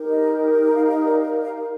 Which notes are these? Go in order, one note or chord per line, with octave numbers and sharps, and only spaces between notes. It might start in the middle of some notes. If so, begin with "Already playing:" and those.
Already playing: D#4 G4 A#4
D#5
D#5
F5
D#5
D5
F5
F5